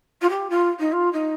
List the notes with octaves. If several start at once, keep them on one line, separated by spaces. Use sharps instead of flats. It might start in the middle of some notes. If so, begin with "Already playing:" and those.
F4
G4
F4
D#4
F4
D#4